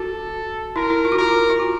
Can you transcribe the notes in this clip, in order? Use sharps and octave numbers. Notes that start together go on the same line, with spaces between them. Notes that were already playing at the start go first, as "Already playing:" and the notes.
Already playing: F#4 A4
E4 A#4
E4
F4
F#4
F4 A#4
F4
F#4